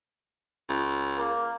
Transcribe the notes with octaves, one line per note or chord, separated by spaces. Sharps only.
C#2
A#3